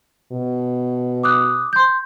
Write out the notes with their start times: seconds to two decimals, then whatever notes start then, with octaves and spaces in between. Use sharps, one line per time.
0.32 B2
1.24 D6 D#6 F#6
1.73 C6 G6